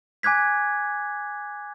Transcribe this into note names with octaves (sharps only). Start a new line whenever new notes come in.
G#5 D6 F#6 G#6 B6